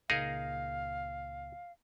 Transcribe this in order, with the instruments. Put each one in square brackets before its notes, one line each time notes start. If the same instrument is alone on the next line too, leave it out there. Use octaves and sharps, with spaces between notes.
[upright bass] C#2 A#2 [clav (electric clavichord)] D#4 G#4 A#4 [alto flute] F5